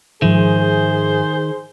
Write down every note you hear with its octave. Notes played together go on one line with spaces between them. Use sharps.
G#2 D#3 F3 G#4 C5 E5